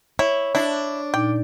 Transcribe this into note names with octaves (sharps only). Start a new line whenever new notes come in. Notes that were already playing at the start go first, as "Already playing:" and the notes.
E4 C#5
D4 E4
A#2 D#4 G5 D6